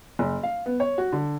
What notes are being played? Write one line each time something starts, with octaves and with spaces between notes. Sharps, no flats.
F#1
F5
B3
C#5
F#4
D3